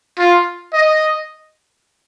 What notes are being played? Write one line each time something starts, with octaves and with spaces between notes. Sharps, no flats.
F4
D#5